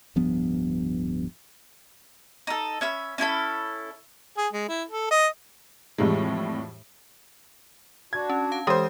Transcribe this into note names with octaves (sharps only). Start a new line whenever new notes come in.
D1 G2 F3 B3
D#4 A4
C#4 E5 B5
C#4 E4 A4 B5
G#4
G#3
E4
A4
D#5
F2 A2 E3 G3 G#3
D4 F#4 G#6
C#4
F5 A5
E3 G#3 G4 C5 D#6